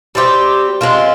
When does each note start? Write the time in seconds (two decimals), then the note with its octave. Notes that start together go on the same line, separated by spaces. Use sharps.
0.15 G3 C4 G4
0.81 G#3 C4 F4